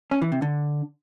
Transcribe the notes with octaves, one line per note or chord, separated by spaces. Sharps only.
C#4
E3
C3
D3